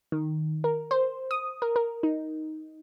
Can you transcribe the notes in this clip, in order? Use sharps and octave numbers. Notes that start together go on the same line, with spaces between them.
D#3
A#4
C5
D#6
A#4
A#4
D#4